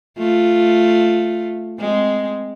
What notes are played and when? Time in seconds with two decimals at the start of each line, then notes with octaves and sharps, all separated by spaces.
0.18 A3 F4
1.79 G#3 C4